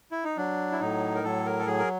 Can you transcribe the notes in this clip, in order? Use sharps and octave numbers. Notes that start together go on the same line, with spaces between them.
E4
D#4
F#3 D4
E4
A2 D#4
A#4
F#3 A4
A#4
A4
F#3 G#4
A#4